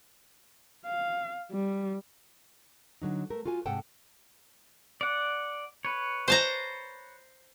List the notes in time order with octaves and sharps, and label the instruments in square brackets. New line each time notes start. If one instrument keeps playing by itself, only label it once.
[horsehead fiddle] F5
G3
[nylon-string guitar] D3 F#3 D#4
A3 A#4
F4 F#4 A4 G#5
G#2 C3 A4 F#5 G5 A5
[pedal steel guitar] D5 F#5
B4 C#5
[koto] C5 A5 A#5